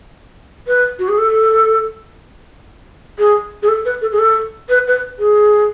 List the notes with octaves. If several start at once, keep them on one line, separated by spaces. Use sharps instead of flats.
B4
F#4
G#4
A4
G#4
G#4
A4
B4
A4
G#4
A4
B4
B4
G#4